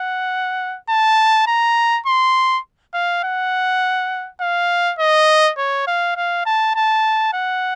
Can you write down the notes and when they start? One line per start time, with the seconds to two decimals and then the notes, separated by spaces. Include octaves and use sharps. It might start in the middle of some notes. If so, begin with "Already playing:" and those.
Already playing: F#5
0.89 A5
1.47 A#5
2.06 C6
2.93 F5
3.23 F#5
4.41 F5
4.99 D#5
5.58 C#5
5.87 F5
6.16 F5
6.45 A5
6.75 A5
7.33 F#5